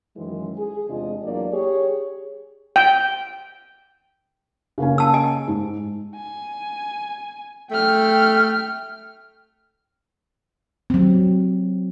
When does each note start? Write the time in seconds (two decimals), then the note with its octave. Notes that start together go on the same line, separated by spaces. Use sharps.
0.17 F#2 D#3 E3 F#3 G#3
0.57 G#4
0.90 E2 C3 G#3 D4 F4 D#5
1.24 E2 E3 F#3 A#3 D4 D5
1.53 G4 G#4 C#5
2.76 G5
4.78 C#3 A#3 C#4
4.98 A5 E6
5.14 D#5 G#5
5.48 G#2
6.16 G#5
7.71 A3 G5 F6
10.90 F#3 C4